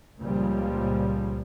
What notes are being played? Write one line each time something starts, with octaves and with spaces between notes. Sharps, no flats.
C#2 A#2 C#3 F3 G3